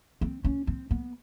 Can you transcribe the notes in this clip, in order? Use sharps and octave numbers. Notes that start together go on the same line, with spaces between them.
C4
C#4
C4
B3